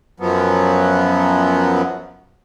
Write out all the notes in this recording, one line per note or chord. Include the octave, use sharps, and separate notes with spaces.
F#2 F3 F#3 B3